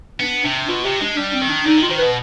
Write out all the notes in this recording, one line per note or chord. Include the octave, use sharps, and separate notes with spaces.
B3 D4
C3 D4
B2 F4
C3 G4
G#3 D4
G3 D4
C4
D#3
D4
D3 D#4
D#3
F4
D#3 C5
B2 B4